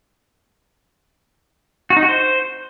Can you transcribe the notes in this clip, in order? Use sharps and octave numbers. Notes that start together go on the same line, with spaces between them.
F#4
D#4
F#4
C5